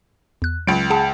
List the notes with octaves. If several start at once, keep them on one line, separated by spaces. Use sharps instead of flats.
E2 F#6
C#2 F#3 D7
G#4 F#5 A5